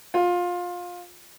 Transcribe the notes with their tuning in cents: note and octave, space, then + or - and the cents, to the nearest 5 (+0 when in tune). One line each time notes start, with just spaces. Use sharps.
F4 +20